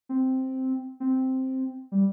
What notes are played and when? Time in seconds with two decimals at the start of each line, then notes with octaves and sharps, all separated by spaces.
0.09 C4
1.00 C4
1.92 G3